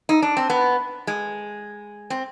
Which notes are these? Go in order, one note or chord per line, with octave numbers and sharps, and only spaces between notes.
D#4
D4
C4
B3
G#3
C4